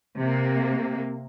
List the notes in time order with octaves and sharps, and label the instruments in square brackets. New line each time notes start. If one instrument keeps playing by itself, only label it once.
[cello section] C3 A#3